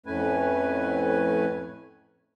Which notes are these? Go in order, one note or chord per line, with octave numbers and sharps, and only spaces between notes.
F2 A2 A3 C#4 B4 G#5